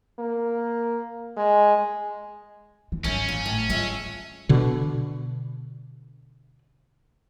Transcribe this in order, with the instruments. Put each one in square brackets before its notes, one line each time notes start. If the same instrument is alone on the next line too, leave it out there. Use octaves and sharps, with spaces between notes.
[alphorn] A#3
G#3
[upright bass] E3
[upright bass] G#1 D#3 [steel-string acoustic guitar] F#2 A#4 G#5 [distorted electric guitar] C#4
[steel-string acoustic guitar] A#2
A2
[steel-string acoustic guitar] G#3 E5 [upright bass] F4
[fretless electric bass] B2 D3